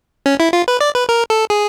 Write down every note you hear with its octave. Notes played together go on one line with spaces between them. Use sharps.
C#4
E4
F4
B4
D5
B4
A#4
A4
G#4